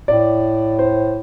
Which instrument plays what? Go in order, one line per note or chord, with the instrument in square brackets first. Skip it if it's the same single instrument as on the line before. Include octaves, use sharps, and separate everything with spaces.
[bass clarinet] A2 [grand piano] D5
[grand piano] C5